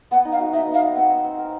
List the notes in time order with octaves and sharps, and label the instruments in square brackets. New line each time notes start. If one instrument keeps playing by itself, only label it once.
[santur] B3 [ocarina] F#5
[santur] D#4
[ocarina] F5
[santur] F#4
[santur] D#4 [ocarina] E5
[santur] B3
[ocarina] F5
[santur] B3
[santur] C4 [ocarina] F#5
[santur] C4
C4
A#4